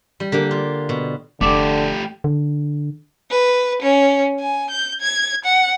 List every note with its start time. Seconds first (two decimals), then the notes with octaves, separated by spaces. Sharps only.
0.20 G3
0.32 D3 A#3 G4
0.51 F4
0.89 B2
1.41 F1 D3 A3 G4 D6
2.24 D3
3.31 B4
3.82 C#4
4.40 G#5
4.70 G6
5.01 G#6
5.45 F#5